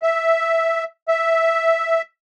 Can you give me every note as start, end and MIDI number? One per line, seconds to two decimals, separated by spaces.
0.03 0.84 76
1.08 2.02 76